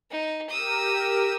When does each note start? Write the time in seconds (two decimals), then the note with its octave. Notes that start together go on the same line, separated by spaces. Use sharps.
0.10 D#4
0.49 G4 A#4 D#6 E6